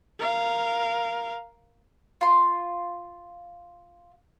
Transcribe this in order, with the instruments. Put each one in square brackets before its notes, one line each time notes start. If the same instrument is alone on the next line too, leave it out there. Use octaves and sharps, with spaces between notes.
[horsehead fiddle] A#4 F5
[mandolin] F4 C6